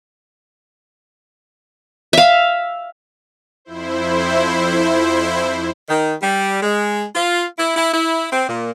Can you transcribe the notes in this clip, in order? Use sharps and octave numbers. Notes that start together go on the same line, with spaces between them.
E5 F5
F2 E4 C5
D#3
G3
G#3
F4
E4
E4
E4
C4
A#2